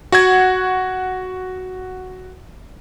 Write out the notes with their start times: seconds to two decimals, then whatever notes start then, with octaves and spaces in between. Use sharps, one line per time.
0.12 F#4 F#5 G#6